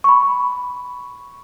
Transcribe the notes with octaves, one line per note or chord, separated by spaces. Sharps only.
B5 C#6